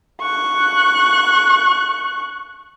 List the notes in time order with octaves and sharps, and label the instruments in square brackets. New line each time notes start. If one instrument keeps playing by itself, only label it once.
[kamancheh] C#6 F#6